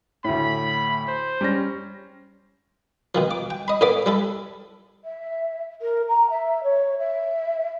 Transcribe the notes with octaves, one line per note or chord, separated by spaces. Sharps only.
D2 A2 B5
C5
G3 C#4 A#6
B2 D#3 F3
D6
G5
D#5 B5
A2 A#3 B3 D5 B5 D6
G3 E4 A4
E5
A#4
A#5
E5
C#5
E5